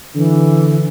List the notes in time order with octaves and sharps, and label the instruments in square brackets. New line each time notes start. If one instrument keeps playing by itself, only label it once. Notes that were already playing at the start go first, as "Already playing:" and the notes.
[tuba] D3 [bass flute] E3